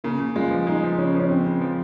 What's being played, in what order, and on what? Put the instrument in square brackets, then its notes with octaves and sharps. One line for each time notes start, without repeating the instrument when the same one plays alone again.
[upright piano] C#3 [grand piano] A#3
[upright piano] C#3
[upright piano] G#3 [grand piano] F4
[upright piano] F3
[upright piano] G#3 [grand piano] D#4
[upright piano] F3
[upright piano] C#3 [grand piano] C#4
[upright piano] F3
[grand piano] C#4
[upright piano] C#3 [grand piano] C4
[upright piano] C#3
F3